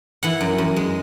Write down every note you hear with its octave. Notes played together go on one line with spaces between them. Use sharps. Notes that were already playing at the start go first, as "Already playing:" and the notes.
E3 F#5
F#2
F#2
G#3